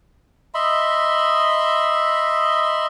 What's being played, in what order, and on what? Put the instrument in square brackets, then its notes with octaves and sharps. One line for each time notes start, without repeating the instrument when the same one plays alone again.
[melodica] D#5 E5 B5 C6